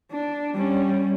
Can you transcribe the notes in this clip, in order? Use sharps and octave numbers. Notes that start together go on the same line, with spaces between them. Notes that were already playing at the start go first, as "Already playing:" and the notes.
D4
G3 C#4